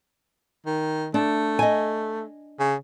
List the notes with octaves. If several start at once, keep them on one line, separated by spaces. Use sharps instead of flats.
D#3
A3 D4
D#5 G#5
C#3